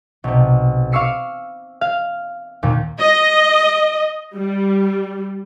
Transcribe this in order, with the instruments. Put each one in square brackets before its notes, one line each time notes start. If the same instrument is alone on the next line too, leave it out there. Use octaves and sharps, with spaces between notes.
[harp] B1 C3
F5 C#6 D6 E6 C7 C#7
F5
D#2 A#2
[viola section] D#5
G3